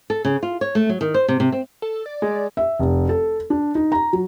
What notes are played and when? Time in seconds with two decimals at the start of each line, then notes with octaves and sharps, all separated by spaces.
0.10 A4
0.25 C#3
0.43 F4
0.61 C#5
0.75 A3
0.89 F#3
1.01 D#3
1.14 C5
1.28 C3
1.40 C3
1.52 C4
1.82 A4
2.06 D5
2.22 G#3
2.57 E5
2.79 F1
3.09 A4
3.50 D4
3.75 D#4
3.92 A#5
4.13 F#3